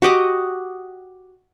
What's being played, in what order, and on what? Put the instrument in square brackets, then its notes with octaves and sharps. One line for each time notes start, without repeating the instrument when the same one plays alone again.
[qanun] F#4 G4 D#5 D6